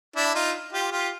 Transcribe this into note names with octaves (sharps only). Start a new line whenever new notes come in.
D4 E4
D#4 F4
F4 G4
F4 G4